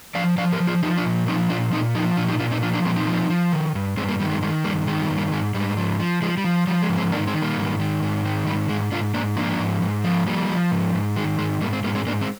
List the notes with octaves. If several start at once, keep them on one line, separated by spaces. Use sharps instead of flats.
F3 D5 F5
F3 D5 F5
G4 A#4
F3
F4 G#4
F3 D#4 G4
D4 F4
A#2
F3 C4 D#4
A#2 D4 F4
A#2 C4 D#4
F3 D#4 G4
A#2 D4 F4
D#4 G4
A#2 D4 F4
C4 D#4
F3 D4 F4
A#3 D4
A#2 G#3 C4
C4 D#4
F3
F3
D#3
G2
G2 G#3 C4
G3 A#3
D#3 G3
G#3
D#3 G#3
G2 G3 A#3
D#3 G#3
G3
G2
G3 A#3
G#2 G#3
G#2 G3
F3
F3
F3 G#3
G3
F3
F3 G3
G#3
G#2
G#3 C4
D#3 A#3 D4
G#3 C4
D#3
G3 A#3
G#2
D#3
G#2
D#3
G#2 G3
G#2 G#3
G#2 D4 F4
G#2 A#3 D4
F3 A#3 D4
G#2
G#2
F3
F3 G3 A#3
F3
G#2
G#2
D#3 G#3
G#2 G#3
G#2 G3 A#3
G#3 C4
G#2 G3 A#3
G#3 C4
G#2 A#3 D4
G#3 C4